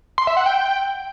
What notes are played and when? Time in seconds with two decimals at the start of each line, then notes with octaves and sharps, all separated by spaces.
0.18 C6
0.27 E5
0.37 F#5
0.46 G5